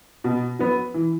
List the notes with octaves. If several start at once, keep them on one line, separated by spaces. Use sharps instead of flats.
B2
F#3 B3
E3